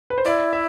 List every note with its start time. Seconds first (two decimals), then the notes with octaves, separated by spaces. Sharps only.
0.10 B4
0.18 C5
0.25 E4 D5
0.53 E5